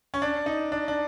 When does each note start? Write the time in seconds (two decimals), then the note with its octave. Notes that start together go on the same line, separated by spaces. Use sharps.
0.14 C#4
0.22 D4
0.46 D#4
0.72 D4
0.88 D4